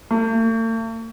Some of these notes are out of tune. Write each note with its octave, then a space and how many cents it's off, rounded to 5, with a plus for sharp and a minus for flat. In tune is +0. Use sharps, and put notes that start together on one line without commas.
A3 +45